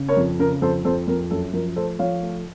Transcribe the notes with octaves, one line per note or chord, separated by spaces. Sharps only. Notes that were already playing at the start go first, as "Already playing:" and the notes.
Already playing: C#3
A#4 C#5
F2
C#3 A#4
F2 A4 C5
F2 A4 C5
F2 A#4
F#2 A4
F3 A#4
A3 A4 C5
F3 C#5 F5
A3